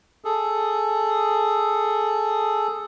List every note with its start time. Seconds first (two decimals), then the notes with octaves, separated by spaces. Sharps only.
0.25 G#4 A4